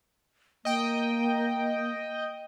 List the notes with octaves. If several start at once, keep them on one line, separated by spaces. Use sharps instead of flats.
A#3 D#5 G5